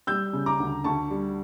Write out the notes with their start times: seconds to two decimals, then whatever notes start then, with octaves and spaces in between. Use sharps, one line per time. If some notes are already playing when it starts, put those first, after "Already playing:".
0.07 G3 E6 G6
0.33 C#3
0.46 A#5 D6
0.60 D2
0.84 D2 A5 C#6
1.10 G3